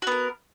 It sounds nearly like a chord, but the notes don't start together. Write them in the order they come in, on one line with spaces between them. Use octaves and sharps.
F#4 B3 A#4